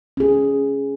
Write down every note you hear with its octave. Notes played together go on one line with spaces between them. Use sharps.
C#4 G#4